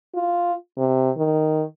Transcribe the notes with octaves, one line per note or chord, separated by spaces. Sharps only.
F4
C3
D#3